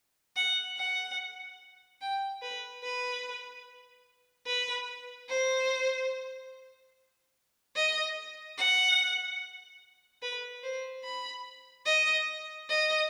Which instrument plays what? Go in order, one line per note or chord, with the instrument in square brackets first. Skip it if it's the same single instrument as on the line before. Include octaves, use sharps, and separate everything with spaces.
[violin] F#5
F#5
G5
B4
B4
B4
C5
D#5
F#5
B4
C5
B5
D#5
D#5